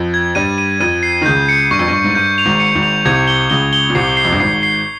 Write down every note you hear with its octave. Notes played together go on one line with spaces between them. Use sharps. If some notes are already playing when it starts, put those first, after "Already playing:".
Already playing: F2 F3
G#6
G2 G3 D#7
D#7
F2 F3 D#7
C7
D#3
C#2 C#3 G6
C#7
G2 C#6
F2
G2
C#6
G#2
G2 G6
F7
G#1 G#2
C#7
G#1 G#2
F7
C2 C3 G#6
G7
C#2 C#3 G7
G7
A#2
C2 C3 C7
C7
F2
G2
G#1 G#2 C7
C7